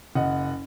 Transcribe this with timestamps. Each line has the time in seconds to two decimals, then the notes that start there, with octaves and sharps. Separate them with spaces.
0.15 F#1 D#5 F#5